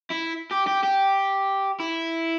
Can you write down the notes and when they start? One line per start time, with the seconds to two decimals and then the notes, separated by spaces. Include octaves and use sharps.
0.10 E4
0.51 G4
0.66 G4
0.83 G4
1.80 E4